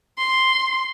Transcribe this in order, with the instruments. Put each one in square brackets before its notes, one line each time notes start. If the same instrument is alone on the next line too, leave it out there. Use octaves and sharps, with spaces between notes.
[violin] C6